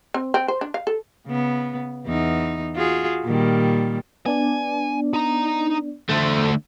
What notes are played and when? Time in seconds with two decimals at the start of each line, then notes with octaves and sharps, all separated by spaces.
0.14 C4
0.34 C4
0.48 C5
0.61 D4
0.74 F5
0.87 A4
1.27 C#3 B3
2.06 E2 D#4
2.75 F4 F#4 G#4
3.24 A#2 D#3 G3
4.26 B3 D4 D5 G#5
5.14 D#4 A#5
6.10 D3 A3 A4 C5